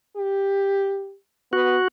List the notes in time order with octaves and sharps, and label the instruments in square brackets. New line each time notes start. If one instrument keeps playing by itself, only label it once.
[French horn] G4
[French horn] B3 [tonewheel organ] F#4